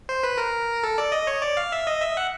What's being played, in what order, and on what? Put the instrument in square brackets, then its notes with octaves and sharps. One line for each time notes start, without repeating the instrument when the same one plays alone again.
[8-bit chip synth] C5
B4
A#4
A4
D5
D#5
C#5
D5
F5
E5
D#5
E5
F#5